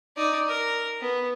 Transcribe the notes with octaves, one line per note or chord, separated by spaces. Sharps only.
D#4 D5
A#4
B3